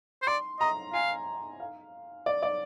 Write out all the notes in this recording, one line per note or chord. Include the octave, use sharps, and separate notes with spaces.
C5
D5 C6
D#5 A#5
F5 G#5
F5
D5
D5